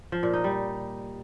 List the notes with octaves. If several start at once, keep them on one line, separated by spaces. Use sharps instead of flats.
F3
A#2
D#4
G3